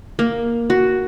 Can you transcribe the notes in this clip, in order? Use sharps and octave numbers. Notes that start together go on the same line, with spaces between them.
A#3
F#4